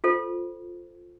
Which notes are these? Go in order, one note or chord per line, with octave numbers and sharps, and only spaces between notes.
F4 A4 C5